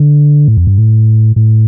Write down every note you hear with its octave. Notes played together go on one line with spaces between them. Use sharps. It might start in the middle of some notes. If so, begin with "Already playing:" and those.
Already playing: D3
A2
F2
G2
A2
A2